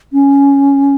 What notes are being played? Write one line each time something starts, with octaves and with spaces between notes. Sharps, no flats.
C#4